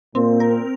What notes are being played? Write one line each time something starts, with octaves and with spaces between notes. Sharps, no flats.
A#2 A#3 C4
A#4